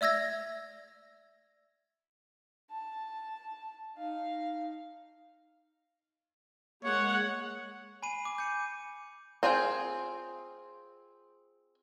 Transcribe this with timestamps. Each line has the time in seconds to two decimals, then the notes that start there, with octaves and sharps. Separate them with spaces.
0.01 D5 E5 E6 G#6 A#6
2.71 A5
3.96 D#4 F5
6.84 G#3 A#3 C#5 F#5
8.02 G#5 B5 C7 D#7
8.25 D6 D#7
8.38 G6 C#7 D#7
9.43 C4 F4 G#4 G5